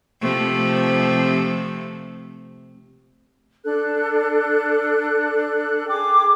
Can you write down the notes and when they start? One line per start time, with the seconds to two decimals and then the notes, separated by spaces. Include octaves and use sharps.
0.22 C3 F3 A3
3.65 D4 A4 F#6
5.88 G#4 G5 D6